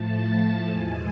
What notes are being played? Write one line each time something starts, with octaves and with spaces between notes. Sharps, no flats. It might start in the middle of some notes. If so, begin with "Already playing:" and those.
Already playing: A2 F3 A3 A5
E2 B2 G#3 G#5